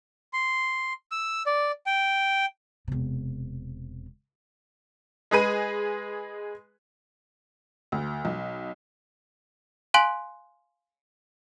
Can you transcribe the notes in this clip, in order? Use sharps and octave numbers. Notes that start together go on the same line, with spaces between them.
C6
E6
D5
G5
E1 C3
G#3 G#4 B4 D#7
D2
B1
F5 G#5 C6 F#6 D7 F#7